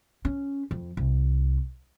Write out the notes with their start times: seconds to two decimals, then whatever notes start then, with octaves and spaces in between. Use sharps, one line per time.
0.25 C#4
0.71 F2
0.97 C2